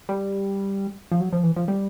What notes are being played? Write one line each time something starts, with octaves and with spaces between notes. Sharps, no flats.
G3
F3
F#3
F3
E3
F3
G3